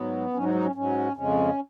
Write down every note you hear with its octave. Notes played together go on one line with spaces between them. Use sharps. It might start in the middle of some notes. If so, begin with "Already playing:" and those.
Already playing: G#2 F#3 B3
G#2 F#3 C#4
D#4
D#4
C#4
G#2 F#3 C#4
F2 C#3 G#3 C#4